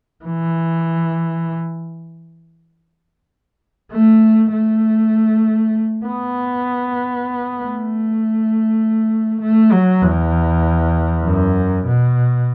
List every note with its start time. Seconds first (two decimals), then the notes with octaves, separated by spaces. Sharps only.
0.25 E3
3.92 A3
4.52 A3
6.06 B3
7.59 A3
9.42 A3
9.72 F#3
10.02 E2
11.24 F#2
11.86 B2